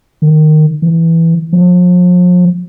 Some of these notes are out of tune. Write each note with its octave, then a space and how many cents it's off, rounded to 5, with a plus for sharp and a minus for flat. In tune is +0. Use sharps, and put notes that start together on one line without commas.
D#3 -15
E3 +0
F3 +40